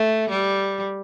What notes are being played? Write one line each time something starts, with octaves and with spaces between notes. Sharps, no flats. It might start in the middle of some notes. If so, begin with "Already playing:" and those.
Already playing: A3
G3